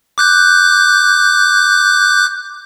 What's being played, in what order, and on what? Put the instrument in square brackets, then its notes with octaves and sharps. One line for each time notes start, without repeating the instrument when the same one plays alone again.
[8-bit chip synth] D6 F#6 G6